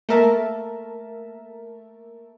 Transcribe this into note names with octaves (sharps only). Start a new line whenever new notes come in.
A3 A#3 A#4 E5 A5